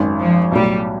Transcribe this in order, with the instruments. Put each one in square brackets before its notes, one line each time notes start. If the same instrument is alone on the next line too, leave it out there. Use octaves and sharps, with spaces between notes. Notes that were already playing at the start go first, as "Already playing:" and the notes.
Already playing: [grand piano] G#1 F#2 D#3
[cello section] F3
[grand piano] B1 A2 F#3 [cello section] G3